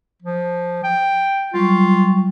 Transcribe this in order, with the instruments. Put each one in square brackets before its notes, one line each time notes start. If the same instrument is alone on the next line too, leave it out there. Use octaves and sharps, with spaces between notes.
[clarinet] F3
G5
[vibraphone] F#3 G3 C#6 [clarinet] F4